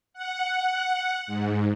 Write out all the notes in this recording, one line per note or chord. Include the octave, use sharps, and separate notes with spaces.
F#5
G#2